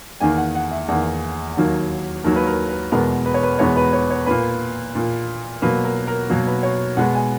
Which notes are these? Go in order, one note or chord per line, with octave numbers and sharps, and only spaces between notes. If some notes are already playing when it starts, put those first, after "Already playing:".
E2 D#3 A#3 G#5
F#5
F#5
E5
E2 D#3 A#3 F#5
D#2 D#3 F#3 A#3
D#2 D#3 F#3 A#3 A#4
B4
A#4
B4
E2 B2 G#3 B3 A#4
B4
C#5
B4
E2 B2 G#3 B3 C#5
B4
C#5
C#5
A#2 A#3 B4
A#2 A#3
B2 F#3 A#3 B4
A#4
A#4
B2 F#3 A#3 A#4
B4
C#5
B2 G#3 B3 F#5
G#5